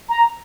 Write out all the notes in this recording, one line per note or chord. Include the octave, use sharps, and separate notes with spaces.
A#5